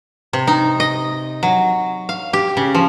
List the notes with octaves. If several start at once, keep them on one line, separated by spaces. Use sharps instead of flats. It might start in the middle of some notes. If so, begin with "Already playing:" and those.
C3
D#4
D#5
F#3
F5
G4
C#3
F3